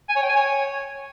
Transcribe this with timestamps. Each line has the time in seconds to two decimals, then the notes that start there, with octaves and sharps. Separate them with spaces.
0.09 G#5
0.16 C#5
0.22 G5
0.29 G#5
0.36 C#5